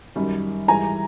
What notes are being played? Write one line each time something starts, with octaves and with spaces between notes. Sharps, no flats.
F#2 D#3 G3
G#2 E3 G3 G#5 A#5